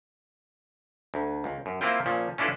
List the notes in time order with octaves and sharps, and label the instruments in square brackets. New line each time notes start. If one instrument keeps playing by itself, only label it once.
[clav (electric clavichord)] D2
C#2
F#2
A#3 C4 E4 F4 G5
A#2 F3 C#4
C#4 D4 E4 F4 A4 B4